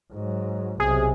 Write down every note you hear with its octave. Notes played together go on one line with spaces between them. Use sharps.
G#2 F#3
B1 C3 G#4